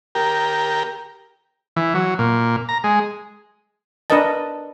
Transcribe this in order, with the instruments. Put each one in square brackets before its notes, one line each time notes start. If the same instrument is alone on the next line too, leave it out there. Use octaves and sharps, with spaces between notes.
[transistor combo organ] G4 A#4
E3
F#3
A#2
A#5
G#3
[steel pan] D4 A#4 B4 D#5 A5